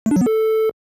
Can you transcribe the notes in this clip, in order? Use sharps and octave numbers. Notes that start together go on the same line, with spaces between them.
A3
D4
F#3
B3
A4